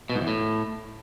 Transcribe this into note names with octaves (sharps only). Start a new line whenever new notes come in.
B2
G#2
E2
A2